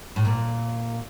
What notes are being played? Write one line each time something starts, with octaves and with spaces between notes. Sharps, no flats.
A2
A#2